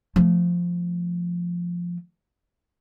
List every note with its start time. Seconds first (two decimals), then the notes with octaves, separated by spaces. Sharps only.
0.16 F3 A3